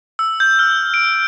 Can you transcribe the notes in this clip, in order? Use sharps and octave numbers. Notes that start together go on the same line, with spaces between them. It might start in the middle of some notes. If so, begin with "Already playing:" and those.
E6
G6
F6
D7